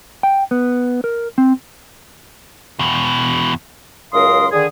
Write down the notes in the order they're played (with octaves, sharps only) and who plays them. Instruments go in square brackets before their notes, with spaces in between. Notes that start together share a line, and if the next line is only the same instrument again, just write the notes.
[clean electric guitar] G5
B3
A#4
C4
[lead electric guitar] E2 B2
[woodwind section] C#2 F#2 A#4 F5 C6 D#6
D3 D#3 G#4